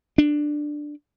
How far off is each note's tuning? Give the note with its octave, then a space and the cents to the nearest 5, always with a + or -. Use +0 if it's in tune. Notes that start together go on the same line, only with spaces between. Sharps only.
D4 +10